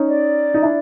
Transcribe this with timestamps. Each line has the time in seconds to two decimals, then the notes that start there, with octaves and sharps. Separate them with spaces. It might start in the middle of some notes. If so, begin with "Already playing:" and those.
Already playing: C#4 D#4
0.08 D5
0.54 D#4
0.62 D4 E4